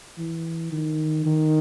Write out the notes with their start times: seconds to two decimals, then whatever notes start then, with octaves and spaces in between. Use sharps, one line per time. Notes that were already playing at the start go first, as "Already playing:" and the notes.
0.18 E3
0.72 D#3
1.26 D#3